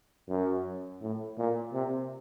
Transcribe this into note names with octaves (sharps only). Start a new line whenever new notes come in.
F#2
A2
A#2
C3